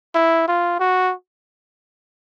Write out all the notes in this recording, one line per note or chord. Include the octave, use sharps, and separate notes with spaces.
E4
F4
F#4